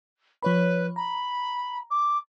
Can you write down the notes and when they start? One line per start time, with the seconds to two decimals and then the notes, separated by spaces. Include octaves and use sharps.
0.43 F3 B4 C#5 B5
0.96 A#5 B5
1.90 D6